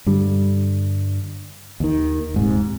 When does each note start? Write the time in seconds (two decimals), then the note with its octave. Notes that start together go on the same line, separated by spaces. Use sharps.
0.06 G2 D3 G3
1.80 D#2 D#3
2.34 D#1 G#2 C3